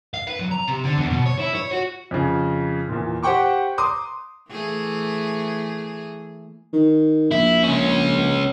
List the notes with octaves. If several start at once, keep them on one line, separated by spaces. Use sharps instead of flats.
F5
B4
F#3
A#5
C3
D3
E2
B2
C#5
E4
C#5
F#4
F2 C#3
E2 A#2
G4 C5 F#5 G5 C#6 D6
A#5 C6 D6 D#6
E3 A3 G#4
D#3
A#1 E4
C#2 C#4